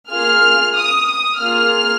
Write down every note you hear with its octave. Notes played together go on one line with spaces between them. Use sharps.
A#3 F4 G#4 F6
D#6
D#6
A#3 F4 G#4 F6